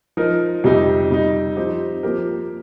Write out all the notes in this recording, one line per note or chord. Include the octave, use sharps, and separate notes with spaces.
F3 D#4 A#4
F2 C3 G3 D#4 G4
C3 G3 D#4
F3 C4 D#4 G4
F3 A#3 G4 A#4